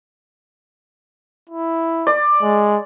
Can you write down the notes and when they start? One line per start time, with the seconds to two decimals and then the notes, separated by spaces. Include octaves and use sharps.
1.50 E4
2.07 D5
2.42 G#3